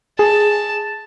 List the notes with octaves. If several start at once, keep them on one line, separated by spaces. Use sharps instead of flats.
G#4 A5